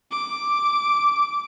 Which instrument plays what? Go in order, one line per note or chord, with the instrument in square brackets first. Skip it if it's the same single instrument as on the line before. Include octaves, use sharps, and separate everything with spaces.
[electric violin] D6